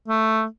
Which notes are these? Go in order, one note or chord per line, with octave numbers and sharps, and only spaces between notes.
A3